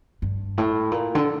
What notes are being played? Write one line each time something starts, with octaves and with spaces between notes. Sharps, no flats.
G2
A2
A#2
D3